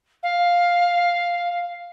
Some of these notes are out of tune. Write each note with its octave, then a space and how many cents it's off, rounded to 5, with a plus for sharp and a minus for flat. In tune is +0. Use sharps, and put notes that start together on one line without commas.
F5 +5